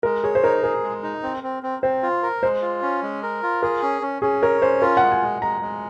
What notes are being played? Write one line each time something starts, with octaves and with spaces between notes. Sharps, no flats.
G#3 A#4
G#4 C#5
C5
D#4 A#4
G#4 A#4
G#3
D#4
C4
C4
C4
C4 C5
F4
A#4
G#3 C5
F4
C#4
G#3
A#4
F4
G#4 A#4
C#4
C#4
C#4 G#4
A#4 C#5
C#4 C5
F4 A#4
F#5
G#3
G#5
G#3
G#3 A#5
G#3